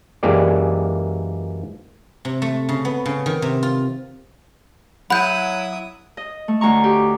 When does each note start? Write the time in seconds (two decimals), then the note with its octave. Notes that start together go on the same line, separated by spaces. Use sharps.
0.23 F#2 E3 G#3 A#3 G4 D5
2.25 C3
2.42 A3
2.69 C#3
2.85 B3
3.06 C#3
3.26 D#3
3.42 C3
3.63 F4
5.10 F#3 E4 F#5 B5 D#6 G6
6.17 D#5
6.48 A3
6.61 D2 C#4 A#5 C#6
6.84 G4